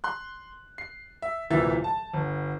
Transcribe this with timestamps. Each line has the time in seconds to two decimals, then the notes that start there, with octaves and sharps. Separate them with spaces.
0.04 C6 F#6
0.78 C7
1.22 E5
1.50 D1 C2 A#2 E3 E5 A6
1.84 A5
2.13 G1